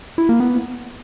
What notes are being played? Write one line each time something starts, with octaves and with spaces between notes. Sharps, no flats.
E4
A#3
B3